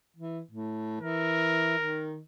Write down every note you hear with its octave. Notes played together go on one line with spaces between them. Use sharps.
E3
A2
E3 A#4
D#3